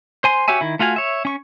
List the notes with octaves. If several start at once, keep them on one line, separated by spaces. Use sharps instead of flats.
C5 G#5 C6
F#4 G4 C#5 E5 G#5
D#3 E4
A3 F4 F#4 F5 G#5
C#5 E5
C#4 C#6